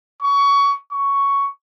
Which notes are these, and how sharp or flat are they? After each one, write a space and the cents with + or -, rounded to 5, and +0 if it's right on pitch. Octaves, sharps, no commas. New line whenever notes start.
C#6 +20
C#6 +5